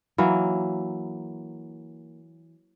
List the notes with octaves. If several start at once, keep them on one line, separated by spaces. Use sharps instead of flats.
E3 F#3 A#3